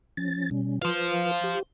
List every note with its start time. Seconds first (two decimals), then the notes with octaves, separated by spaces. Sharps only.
0.17 F3 C#4 A6
0.51 B2 G3 C#4
0.82 F4 B4 C5 F5
1.44 G4